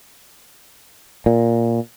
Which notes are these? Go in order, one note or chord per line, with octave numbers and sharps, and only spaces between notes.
A#2